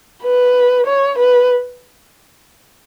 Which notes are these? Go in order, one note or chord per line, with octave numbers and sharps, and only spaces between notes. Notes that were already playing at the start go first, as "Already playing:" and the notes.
B4
C#5
B4